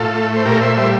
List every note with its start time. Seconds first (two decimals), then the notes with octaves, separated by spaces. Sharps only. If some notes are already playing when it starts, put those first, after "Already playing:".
Already playing: A2 F4 A4
0.15 A3
0.36 C5
0.45 A#2 G4 A#4
0.61 C5 E5
0.77 G3 C5 E5